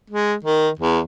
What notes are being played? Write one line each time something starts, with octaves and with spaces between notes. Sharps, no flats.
G#3
D#3
E2